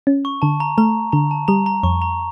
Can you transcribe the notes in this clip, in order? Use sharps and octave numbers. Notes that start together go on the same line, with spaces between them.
C#4
C#6
D3 A5
A#5
A3 A#5
D3 A#5
A5
G3 A#5
A#5
F2 C#6
A#5